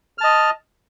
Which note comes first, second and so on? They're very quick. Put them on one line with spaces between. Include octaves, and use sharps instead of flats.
F6 A5 D#5